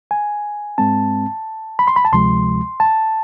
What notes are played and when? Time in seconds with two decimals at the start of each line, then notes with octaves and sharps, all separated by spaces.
0.11 G#5
0.78 G#2 G#3 C4 A5
1.79 B5
1.88 C6
1.96 B5
2.05 A5
2.12 D2 C3 F3 G#3 C6
2.80 A5